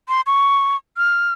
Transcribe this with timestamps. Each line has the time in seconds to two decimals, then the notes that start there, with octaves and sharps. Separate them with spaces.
0.09 C6
0.27 C#6
0.97 F6